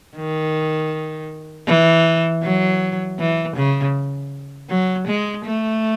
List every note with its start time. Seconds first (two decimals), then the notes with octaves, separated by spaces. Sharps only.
0.17 D#3
1.67 E3
2.43 F#3
3.19 E3
3.56 C#3
4.70 F#3
5.07 G#3
5.45 A3